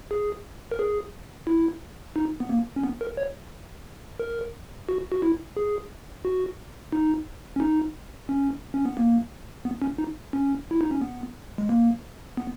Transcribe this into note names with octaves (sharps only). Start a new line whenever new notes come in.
G#4
A#4
G#4
E4
D#4
B3
A#3
C#4
B3
A#4
C#5
A#4
F#4
F#4
E4
G#4
F#4
D#4
C#4
D#4
C#4
C#4
B3
A#3
B3
C#4
D#4
C#4
E4
D#4
C#4
B3
G#3
A#3
B3